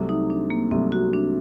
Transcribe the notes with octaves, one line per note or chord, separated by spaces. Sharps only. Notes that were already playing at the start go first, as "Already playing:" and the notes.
Already playing: C2 C3 F#3 A3
D#4
D4
A#3
C2 C3 F#3 A3 C4
F#4
D4